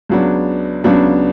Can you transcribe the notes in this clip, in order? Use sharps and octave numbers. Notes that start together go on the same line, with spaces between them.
C#2 C#3 F#3 B3 D4
C#2 C#3 F#3 B3 D4